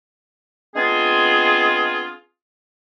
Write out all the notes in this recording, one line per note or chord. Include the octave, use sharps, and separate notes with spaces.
G#3 B3 C4 D4 F4 G#4